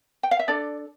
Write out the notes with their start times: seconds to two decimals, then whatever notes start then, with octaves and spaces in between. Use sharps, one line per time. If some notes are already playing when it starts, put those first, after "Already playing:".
0.23 G5
0.31 F5
0.39 E5
0.48 D4 A4 D5